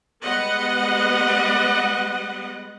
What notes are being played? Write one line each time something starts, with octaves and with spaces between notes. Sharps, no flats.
G3 G#3 B3 B4 D#5 F#5